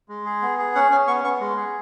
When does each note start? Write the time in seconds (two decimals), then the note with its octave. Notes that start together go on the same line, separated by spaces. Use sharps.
0.09 G#3
0.25 G#4
0.42 B3
0.59 G#4
0.75 C#4 F#5
0.91 C#4 G#5
1.07 B3 C#6
1.24 B3 C#6
1.41 G#3
1.57 G#4